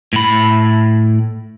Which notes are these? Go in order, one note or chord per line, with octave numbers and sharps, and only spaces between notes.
A2 B5